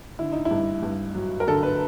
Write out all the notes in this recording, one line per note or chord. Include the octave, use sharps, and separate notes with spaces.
D3 E4
D#4
E4
G2
G2
F#3
A#4
D3 A4
B4